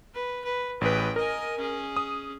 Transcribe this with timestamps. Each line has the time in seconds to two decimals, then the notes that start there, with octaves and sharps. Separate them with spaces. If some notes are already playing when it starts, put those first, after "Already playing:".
0.14 B4
0.44 B4
0.81 A1 G#4 B4 G5
1.16 A#4 D#5 G#5
1.58 C#4 G#4
1.96 D#6